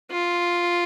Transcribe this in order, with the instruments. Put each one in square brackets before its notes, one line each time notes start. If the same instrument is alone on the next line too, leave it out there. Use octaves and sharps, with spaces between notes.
[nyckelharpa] F4